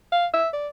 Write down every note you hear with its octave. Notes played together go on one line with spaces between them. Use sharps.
F5
E5
D5